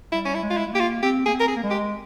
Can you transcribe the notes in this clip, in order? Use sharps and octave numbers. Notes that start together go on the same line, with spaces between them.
G3 E4
C#4
E4
G#3
F4
E4
G#3
A#3 G4
F4
C4 G4
A#3 G#4
C4
A#4
G#4
A#3
G#3
G4